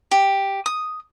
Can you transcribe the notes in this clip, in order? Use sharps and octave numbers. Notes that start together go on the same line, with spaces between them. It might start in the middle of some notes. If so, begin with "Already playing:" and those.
G4
D#6